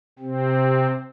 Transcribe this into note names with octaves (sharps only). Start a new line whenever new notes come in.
C3 C4